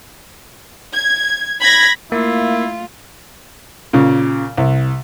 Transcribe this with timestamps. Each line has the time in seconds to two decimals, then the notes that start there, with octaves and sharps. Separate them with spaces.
0.93 G#6
1.60 B5 G#6 A#6
2.12 A3 A#3 E4 F4
3.93 A#2 C#3
4.58 C2